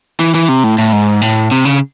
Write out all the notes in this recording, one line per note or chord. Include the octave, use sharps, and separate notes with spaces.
E3
E3
C3
A2
A2
G#2
A2
C3
C#3